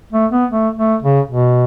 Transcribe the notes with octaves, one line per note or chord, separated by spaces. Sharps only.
A3
B3
A3
A3
C#3
B2